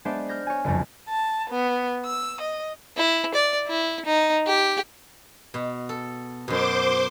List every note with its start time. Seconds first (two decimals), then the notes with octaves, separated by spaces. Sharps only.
0.05 G#3 B3 D4 C5 D5 E5
0.29 F6 G6 A#6
0.47 C#5 G#5
0.64 F#1 C2 F2 A#4
1.10 A5
1.50 B3
2.06 E6
2.41 D#5
2.97 E4
3.34 D5
3.67 E4
4.05 D#4
4.46 G4
5.54 B2
5.89 A4
6.48 F#2 B2 C5 C6 D6